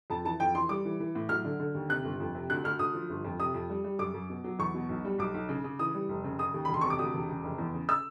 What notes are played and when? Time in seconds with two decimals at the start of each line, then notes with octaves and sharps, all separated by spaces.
0.10 F2 A5
0.25 E3 A5
0.40 F2 G5
0.55 E3 C6
0.69 G3 D6
0.85 E3
1.00 E3
1.15 A2
1.29 F#3 F6
1.45 D3
1.60 D3
1.74 D#2
1.89 C3 F#6
2.05 G1
2.20 F2
2.35 C3
2.50 D2 F#6
2.64 D2 F6
2.79 D2 D#6
2.94 F3
3.10 G1
3.24 F2
3.39 C3 D#6
3.54 F2
3.70 G3
3.84 G3
3.99 F#2 D6
4.14 F#2
4.30 B2
4.44 F#3
4.59 E2 C#6
4.74 B2
4.89 B1
5.05 G3
5.19 B1 D6
5.34 B1
5.49 C#3
5.64 C#3
5.79 E3 D#6
5.94 G3
6.09 F1
6.24 C#3
6.39 C#3 D#6
6.54 D#2
6.65 B5
6.68 E1
6.74 C6
6.81 C3 C#6
6.90 D6
6.99 D2 D#6
7.14 E1
7.29 C#3
7.44 F1
7.58 E2
7.74 C#3
7.89 E6